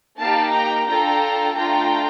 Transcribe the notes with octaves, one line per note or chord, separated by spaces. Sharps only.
A#3 D#4 G4 F5 A5
G5 A#5
D4 F4 A4 G5 A#5
A3 D4 F4 A4 G5 A#5